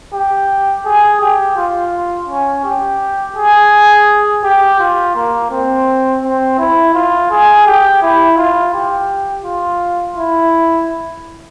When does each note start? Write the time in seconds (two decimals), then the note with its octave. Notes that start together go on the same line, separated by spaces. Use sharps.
0.14 G4
0.85 G#4
1.21 G4
1.57 F4
2.29 C#4
2.64 G4
3.36 G#4
4.44 G4
4.80 F4
5.15 A#3
5.51 C4
6.23 C4
6.58 E4
6.94 F4
7.31 G#4
7.66 G4
8.02 E4
8.37 F4
8.74 G4
9.45 F4
10.17 E4